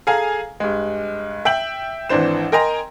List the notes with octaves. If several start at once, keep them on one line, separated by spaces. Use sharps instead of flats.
G#4 A4 F5 G#5 A#5
G2 G#3
E5 G5 G6 F#7
G#1 E3 D4 C5 E7
A#4 D#5 G5 G#5 A#5 C6